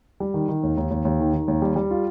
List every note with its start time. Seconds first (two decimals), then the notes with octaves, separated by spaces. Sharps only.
0.20 G3
0.34 D#3
0.49 D#3
0.63 D#2
0.77 D#2
0.91 D#2
1.05 D#2
1.20 D#3
1.33 D#3
1.48 D#2
1.62 G3
1.76 G3
1.91 F4